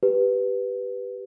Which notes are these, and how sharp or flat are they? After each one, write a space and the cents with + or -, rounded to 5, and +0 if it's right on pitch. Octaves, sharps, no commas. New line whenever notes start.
G4 +0 B4 +0